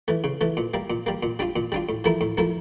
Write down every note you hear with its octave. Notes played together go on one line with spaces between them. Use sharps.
E3 A3
C#3
E3 A3
A#2
G3 A#3
A#2
G3 A#3
A#2
G3 D4 F4
A#2
G3 D4 F4
A2
F3 A3 E4 A#4
A2
F3 A3 E4 A#4